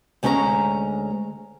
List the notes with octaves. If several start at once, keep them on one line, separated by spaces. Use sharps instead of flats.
D2 G#3 C#4 F#5 A#5